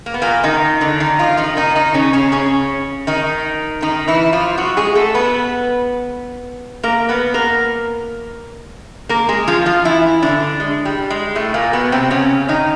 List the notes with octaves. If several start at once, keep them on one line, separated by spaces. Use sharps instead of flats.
A#3
B3
A#2 A#3
D#3 D#4
D3 D4
D#3 D#4
F3 F4
D#3 D#4
D#3 D#4
D#3 D#4
C#3 C#4
C#3 C#4
C#3 C#4
D#3 D#4
D#3 D#4
E3 E4
F3 F4
F#3 F#4
G#3 G#4
A3 A4
B3 B4
A#3 A#4
B3 B4
A#3 A#4
A#3 A#4
G#3 G#4
F3 F4
F3 F4
E3 E4
D3 D4
G#3
G3
G#3
A2 A3
A#2 A#3
B2 B3
C3 C4
C#3 C#4
D#3 D#4